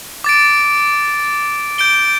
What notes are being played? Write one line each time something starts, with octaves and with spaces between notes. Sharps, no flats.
D6 A6 D7
G6 D7 G7